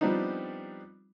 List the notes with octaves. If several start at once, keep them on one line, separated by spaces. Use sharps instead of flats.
F3 G3 B3 C4 D4 D#4